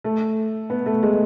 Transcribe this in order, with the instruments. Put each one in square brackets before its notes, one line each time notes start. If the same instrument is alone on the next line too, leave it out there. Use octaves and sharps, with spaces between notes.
[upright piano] A3
B3
A3
G#3